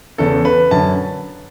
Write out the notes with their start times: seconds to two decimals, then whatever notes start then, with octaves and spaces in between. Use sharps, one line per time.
0.18 E2 C#3 E3 A4
0.45 B4
0.71 F#2 D3 A5